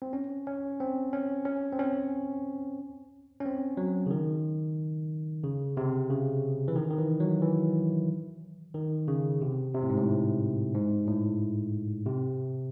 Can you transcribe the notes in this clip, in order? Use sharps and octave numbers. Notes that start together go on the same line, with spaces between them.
C4
C#4
C#4
C4
C#4
C#4
C4
C#4
C#4
C4
F#3
C#3
D#3
C#3
C3
C#3
E3
D#3
D#3
E3
F#3
E3
D#3
C#3
C3
C3
A2
G#2
A2
G#2
A2
C3